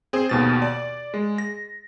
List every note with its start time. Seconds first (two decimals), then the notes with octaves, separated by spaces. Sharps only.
0.13 C4 G#4 C5
0.29 D#2 B2 A6
0.62 D5
1.14 G#3
1.38 A#6